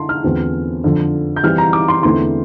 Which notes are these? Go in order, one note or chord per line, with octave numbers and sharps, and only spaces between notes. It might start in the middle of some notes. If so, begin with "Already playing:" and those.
Already playing: D3 E4 A5 C6
F6
E2 D3 A3 C4 F4
F2 D3 F3
G6
E3 G3 C4 E4 F6
A#5
D6
C6
E2 D3 A3 C4 E4 C6